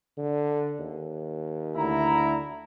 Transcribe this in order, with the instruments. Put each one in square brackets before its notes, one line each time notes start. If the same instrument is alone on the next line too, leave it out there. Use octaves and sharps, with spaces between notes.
[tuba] D3
D#2
[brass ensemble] D2 E4 A#5